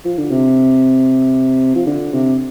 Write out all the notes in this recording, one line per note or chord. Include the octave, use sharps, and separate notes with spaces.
F3
D3
C3
F3
D3
C3